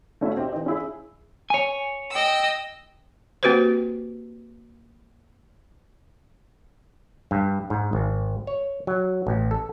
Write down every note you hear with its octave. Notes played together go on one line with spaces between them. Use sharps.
A3 C#4 E4 F#4 E5
C4 D#4 G4
E3 D#4
C#4 E4 G#4
C#5 G#5
D#5 G5 E6
A#3 C4 F#4 G4 B4 C5
G2
G#2
G#1
C#5
F#3
A1
A4